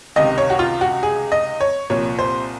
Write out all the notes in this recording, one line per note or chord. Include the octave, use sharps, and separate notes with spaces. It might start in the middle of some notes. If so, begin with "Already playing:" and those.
C#2 C3 D#3 D#5
C#5
F#4
F4
F#4
G#4
D#5
C#5
C2 A#2 F3 C#5
C5